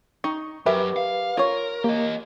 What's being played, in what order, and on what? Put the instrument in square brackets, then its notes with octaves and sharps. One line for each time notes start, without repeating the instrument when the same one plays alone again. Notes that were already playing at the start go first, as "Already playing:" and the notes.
[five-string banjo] D#4 [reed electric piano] C#6
[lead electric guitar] F#2 [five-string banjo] G4 A#4 E5 [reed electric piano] B4
[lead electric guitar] F5
[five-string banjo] F4 C#5 [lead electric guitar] A#4
[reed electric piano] A#3 [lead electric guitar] G4 D#5